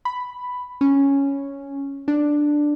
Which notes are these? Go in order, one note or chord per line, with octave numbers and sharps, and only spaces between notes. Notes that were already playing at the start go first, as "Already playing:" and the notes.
B5
C#4
D4